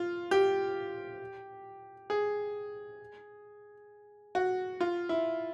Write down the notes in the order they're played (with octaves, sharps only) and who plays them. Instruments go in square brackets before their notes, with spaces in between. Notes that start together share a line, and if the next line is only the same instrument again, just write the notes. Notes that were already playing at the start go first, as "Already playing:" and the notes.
Already playing: [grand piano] F4
G4
G#4
F#4
F4
E4